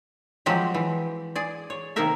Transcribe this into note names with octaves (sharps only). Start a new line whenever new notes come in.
F3 F#3 G#3 C4 G4
E3
G#4 D5
C#5
C3 D#3 A#3 D#4 A#4 E5